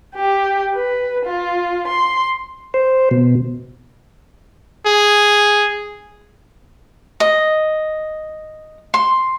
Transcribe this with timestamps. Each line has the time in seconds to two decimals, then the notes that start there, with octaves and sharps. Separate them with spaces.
0.15 G4
0.75 B4
1.25 F4
1.88 C6
2.74 C5
3.11 B2
4.86 G#4
7.20 D#5
8.94 C6